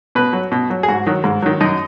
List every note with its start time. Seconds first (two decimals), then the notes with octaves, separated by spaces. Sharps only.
0.15 B2 B4
0.33 F#3
0.52 B2
0.70 F#3
0.83 G#4
0.88 G#2 F#4
1.06 D#3 F#3
1.24 G#2
1.42 D#3 F#3
1.61 F#2 D#4